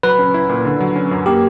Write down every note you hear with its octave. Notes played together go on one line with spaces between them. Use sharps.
F#3 B4
C#4
E4
A#2
D3
F#3
C#4
F#2
A#3 G4